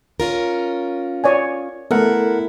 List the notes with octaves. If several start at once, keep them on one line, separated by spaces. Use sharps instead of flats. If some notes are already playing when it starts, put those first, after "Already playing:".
C#4 F4 A#4
C#5 D5 G#5
A3 B3 E4 A4 A#4 F#5